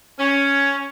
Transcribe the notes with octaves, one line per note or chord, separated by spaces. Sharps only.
C#4